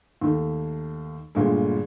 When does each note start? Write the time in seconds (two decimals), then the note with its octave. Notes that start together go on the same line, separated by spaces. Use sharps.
0.22 D#2 D#3 A3
1.35 G1 A#2 D3 G#3